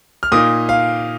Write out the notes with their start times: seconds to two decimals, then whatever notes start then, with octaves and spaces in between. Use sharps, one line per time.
0.23 F6
0.32 A#2 A#3 D#4 D#6
0.69 F5